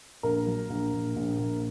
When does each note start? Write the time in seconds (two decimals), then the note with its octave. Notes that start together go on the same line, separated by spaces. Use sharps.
0.23 A#1 A#4
0.46 F#3
0.70 A#1
0.93 A#1
1.16 A#1
1.39 A#1